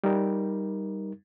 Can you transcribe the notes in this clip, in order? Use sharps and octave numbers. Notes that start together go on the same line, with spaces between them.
G3 D#4 A#4